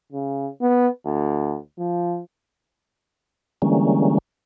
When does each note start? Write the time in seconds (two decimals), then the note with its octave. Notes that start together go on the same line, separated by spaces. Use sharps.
0.12 C#3
0.61 B3
1.05 D2
1.79 F3
3.62 D3 E3 G3 G#3 A#3 C#4